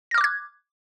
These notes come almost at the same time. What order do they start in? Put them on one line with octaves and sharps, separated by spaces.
A#6 F6 D6 F#6 G#6